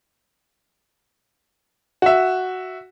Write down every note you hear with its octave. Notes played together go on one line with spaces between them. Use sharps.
F#4 E5